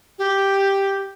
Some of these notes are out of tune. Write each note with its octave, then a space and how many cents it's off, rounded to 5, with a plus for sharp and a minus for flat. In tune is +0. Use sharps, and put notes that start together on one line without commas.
G4 +0